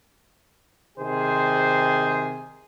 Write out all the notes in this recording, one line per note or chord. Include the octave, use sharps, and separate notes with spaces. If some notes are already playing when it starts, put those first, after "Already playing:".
C3 D#3 G#4 C5